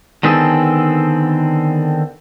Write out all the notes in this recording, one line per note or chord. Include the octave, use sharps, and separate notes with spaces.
D3 D#3 B3 C4 G#4 A4